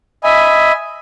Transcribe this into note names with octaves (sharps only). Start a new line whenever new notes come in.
D#5 E5 G#5 B5